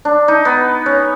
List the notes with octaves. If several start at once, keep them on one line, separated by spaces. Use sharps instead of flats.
D4
D#4
B3
C#4